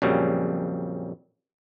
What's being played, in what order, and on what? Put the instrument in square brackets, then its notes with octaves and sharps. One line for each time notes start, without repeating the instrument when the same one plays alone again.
[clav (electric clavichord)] A#1 F2 C#3 F#3 G3